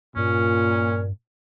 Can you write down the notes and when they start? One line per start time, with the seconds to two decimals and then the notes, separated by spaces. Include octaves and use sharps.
0.17 G2 A#2 C#4